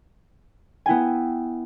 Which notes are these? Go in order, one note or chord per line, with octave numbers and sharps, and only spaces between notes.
B3 E4 G5 G#5